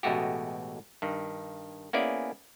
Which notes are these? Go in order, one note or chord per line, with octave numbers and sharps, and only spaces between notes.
A1 B2 G#3 A3 F#4 G4
G2 D#3
A#3 B3 C#4 E4 G#4 D5